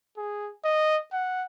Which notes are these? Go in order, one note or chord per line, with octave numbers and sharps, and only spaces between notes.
G#4
D#5
F#5